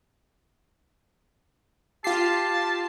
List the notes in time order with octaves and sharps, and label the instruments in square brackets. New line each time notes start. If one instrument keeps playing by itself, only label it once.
[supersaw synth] F4 C7 [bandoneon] G4 [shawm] A5